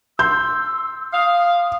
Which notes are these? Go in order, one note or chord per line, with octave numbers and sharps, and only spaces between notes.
C6 E6 G6
F5 D#6